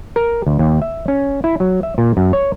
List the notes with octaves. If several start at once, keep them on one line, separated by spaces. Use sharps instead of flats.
A#4
D2
D#2
E5
C#4
E4
F#3
E5
A#2
F#2
C#5